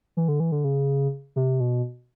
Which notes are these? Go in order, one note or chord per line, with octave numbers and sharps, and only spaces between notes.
E3
D3
E3
D3
C#3
C3
B2